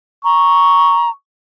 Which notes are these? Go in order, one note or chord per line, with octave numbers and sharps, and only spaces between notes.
A#5 C#6